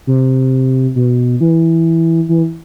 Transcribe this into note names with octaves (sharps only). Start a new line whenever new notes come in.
C3
B2
E3
E3